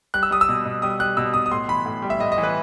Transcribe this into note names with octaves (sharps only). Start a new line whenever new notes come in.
G3 F#6
E6
G3 D#6
E6
B2
B2
G3 D#6
G3 F#6
B2 E6
B2 D#6
D#6
A2 C6
E3 B5
A2
G3
E5
A2 D#5
D#5
E3
B4